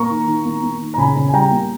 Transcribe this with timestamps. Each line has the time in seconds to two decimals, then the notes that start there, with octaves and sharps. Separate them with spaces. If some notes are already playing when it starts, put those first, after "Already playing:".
Already playing: A#3 A#5 C#6
0.10 D#3
0.27 D#3
0.46 A#3
0.63 A#3
0.81 D#3
0.94 A#5
0.98 C#3 G#5 B5
1.16 C#3
1.28 G#5
1.33 G3 G5 A#5
1.51 A#3